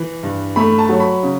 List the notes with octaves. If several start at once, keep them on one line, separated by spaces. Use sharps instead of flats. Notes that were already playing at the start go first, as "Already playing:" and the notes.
Already playing: E3
G2
A3 B5
A5
F#3
B5
C#3